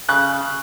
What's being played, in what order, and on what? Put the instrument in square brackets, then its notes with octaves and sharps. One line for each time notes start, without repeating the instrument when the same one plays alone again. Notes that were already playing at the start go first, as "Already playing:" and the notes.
[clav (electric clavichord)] C#3 [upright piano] F#6